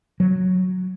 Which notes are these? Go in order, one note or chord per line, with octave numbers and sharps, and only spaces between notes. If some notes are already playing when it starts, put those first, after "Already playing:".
F#3